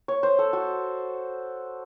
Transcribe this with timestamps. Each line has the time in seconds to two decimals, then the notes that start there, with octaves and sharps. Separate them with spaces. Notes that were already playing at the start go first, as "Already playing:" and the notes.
0.08 C#5
0.23 C5
0.39 A4
0.53 F#4